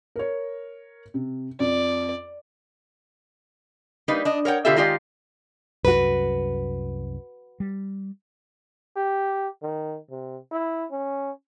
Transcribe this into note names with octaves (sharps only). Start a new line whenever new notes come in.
A#4 C#5
C3
F2 D5
G3 A#3 D#4 B4
D4 D#5
A#4 C#5 F#5 G5
B2 D3 F4 G4 A4 E5
D#3 G#3 F4 G4 D5
C2 F#2 F#4 B4
G3
G4
D#3
C3
E4
C#4